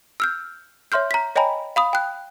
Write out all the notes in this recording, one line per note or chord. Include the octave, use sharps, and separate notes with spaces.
E6 F6 G6
C#5 E5 C6 F6 G6
A#5 B6
C#5 D#5 G5 G#5 A#5 B5
F5 B5 D#6
G5 F#6